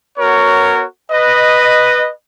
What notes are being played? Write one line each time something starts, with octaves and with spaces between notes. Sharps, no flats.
B3 F#4 A#4 C#5
B4 D#5